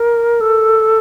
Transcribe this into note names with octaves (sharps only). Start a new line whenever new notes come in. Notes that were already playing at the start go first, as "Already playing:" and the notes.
Already playing: A#4
A4